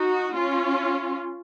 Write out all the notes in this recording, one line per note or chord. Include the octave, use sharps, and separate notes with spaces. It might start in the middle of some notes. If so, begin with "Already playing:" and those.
Already playing: D#4 F#4
C#4 F4